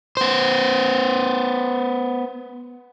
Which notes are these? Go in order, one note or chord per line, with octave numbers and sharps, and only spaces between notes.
B3 C5